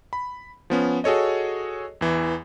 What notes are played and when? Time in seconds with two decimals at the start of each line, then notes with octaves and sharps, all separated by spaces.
0.13 B5
0.70 F3 B3 C#4
1.04 F#4 G#4 A4 C#5 D#5
2.01 E2 E3